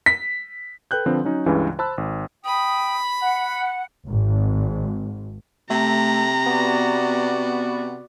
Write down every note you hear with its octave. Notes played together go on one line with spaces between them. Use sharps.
B6
A4 B4 G5 F#6 G6
D3 F3 C4 B4
F#3 C#4 D#4
C#2 G2 C#3 E3 C#4
C5 A5 B5 E6 F#6
G#1
G5 B5 D#6
F#5
G#1
C3 A3 A#5
B3 F#4 D5